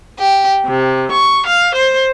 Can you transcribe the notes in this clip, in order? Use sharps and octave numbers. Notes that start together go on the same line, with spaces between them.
G4
C3
C#6
F5
C5